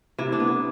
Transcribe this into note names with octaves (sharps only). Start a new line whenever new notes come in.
C3 E4
D4
B3
E4